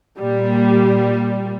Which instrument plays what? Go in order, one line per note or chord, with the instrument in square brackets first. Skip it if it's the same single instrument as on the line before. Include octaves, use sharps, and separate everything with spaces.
[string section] A#2 G3